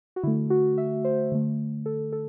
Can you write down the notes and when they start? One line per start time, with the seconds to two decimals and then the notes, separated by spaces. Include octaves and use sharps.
0.16 F#4
0.23 D3 A3 E4
0.50 F#4
0.78 E5
1.05 C5
1.32 D3 A3
1.86 A4
2.13 A4